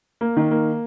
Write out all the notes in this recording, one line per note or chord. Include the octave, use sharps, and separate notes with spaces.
A#3
D#3
A#3